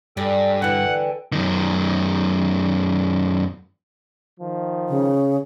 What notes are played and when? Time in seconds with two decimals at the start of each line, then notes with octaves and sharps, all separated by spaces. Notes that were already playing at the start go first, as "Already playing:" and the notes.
0.17 G2 G3 A4 G5 G#5
0.62 D3 E3 F#5
1.32 F#2 D#3
4.40 D#3 F3
4.89 C#3